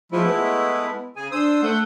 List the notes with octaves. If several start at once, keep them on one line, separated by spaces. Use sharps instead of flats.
F3 G#3 A3 E4
B3
C#3 G#4 G#5
D4 C5 D#6 E6
A3 F#5 G6